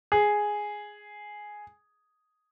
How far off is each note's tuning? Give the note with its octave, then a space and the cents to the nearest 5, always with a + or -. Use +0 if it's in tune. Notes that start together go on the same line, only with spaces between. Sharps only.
G#4 +0